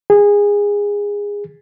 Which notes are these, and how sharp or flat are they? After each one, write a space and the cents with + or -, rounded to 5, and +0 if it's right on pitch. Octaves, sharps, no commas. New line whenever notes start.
G#4 -20